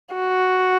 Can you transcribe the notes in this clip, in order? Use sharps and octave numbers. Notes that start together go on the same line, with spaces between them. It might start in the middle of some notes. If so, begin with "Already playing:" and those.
F#4